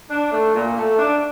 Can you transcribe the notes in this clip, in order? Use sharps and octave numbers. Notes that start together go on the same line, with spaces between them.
D4
A3
A#2
A3
D4